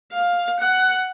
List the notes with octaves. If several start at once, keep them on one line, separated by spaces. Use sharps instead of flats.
F5
F#5